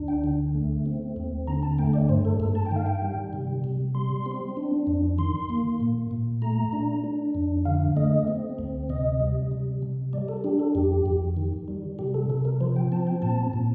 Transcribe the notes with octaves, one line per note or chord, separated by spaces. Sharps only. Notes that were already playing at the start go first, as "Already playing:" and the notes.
Already playing: D2 D4
G5
D3
A3
C4
D#2
D3 A#5
A5
A3 G5
D5
G2 C5
A4
G2 A4
A5
G5
D#3
F5
G5
G3
C3
C3
G3 C6
C4
D4
F2
D#3 C6
A#3
A#2
A#2
A3 A#5
D4
D4
F2
D3 F5
A3 D#5
C4
D2
C3 D#5
G3
C3
C3
G3 D5
A4
D4 G4
A4
F2 G4
F2
D#3
G3
C3 G4
A4
C3 A4
A#4
F3 C5
G5
C4 A5
G5
A#2 A5
A#2